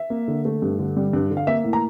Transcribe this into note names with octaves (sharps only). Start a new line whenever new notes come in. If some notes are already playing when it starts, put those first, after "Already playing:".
Already playing: E5
A#3
D3
A3
G2
D3
G3
G2
D3
F5
A#3 E5
A2
A#5